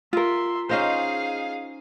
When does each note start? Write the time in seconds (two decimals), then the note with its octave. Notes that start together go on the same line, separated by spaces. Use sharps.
0.13 F4 A#4 E5 C6
0.69 C#4 D#4 G#4 C5 F5